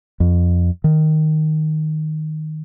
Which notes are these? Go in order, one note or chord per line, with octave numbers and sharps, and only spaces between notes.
F2
D#3